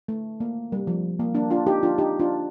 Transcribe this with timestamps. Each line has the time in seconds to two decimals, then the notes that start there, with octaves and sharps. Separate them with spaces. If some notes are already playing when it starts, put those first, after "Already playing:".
0.08 A3
0.40 A#3
0.72 G3
0.87 F3
1.20 A#3
1.35 A#3 D4
1.50 D4 F4
1.67 D#4 G4
1.83 D4 F4
1.98 D#4 G4
2.19 D4 F4